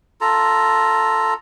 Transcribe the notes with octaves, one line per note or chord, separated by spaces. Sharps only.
F4 A4 A#5